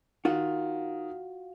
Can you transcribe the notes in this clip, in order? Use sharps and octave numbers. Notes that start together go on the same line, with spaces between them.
D#3 F4 F#4